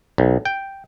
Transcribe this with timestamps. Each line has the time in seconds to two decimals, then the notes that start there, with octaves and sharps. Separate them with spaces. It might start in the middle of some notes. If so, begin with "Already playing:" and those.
0.18 B1
0.45 G5